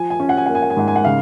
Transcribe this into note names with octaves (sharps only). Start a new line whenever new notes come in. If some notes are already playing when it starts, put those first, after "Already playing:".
Already playing: F3 G#5
G#5
C#4
F#5
G#5
A#3 F#5
G#5
F#5
G#5
G#2 F#5
G#5
F#5
C#3 F5